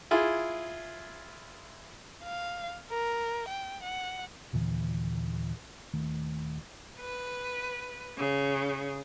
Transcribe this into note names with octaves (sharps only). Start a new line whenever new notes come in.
E4 F4 G#4
F5
A#4
G5
F#5
D#2 A#2 D3 E3
D#1 D#3 A3
B4
C#3